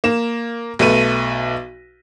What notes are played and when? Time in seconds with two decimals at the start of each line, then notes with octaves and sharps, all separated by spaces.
0.04 A#3 E7
0.79 B1 A3 B4 D#7